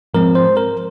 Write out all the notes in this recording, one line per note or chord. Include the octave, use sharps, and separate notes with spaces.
G#2 F3 G#3 C4 A#4
C5
A#4